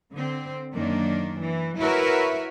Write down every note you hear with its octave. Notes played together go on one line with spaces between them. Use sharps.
D3 C4
F#2 D#3 A#3 D4
E3
E4 F#4 A#4 B4 C#5 E5